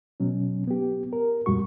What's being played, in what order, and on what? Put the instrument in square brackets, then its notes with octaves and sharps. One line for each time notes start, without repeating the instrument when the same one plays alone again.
[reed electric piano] B2 F#3 C#4
B3 G4
A#4
F2 A#2 G3 F#4 C#6